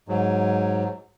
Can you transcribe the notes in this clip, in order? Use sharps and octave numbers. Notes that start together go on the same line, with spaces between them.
G#2 F#3